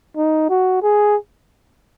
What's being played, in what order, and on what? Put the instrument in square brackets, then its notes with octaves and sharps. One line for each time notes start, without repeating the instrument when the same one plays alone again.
[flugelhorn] D#4
F#4
G#4